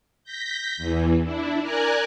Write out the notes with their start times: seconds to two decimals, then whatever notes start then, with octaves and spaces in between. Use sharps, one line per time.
0.24 G6 A#6 B6
0.77 E2 E3
1.23 D4 E4
1.62 A#4 D5 G#5 A#5 F#6 G#6